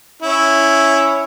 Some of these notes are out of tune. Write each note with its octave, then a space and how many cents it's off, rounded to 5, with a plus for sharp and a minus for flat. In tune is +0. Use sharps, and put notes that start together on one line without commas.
C#4 +0 E4 +0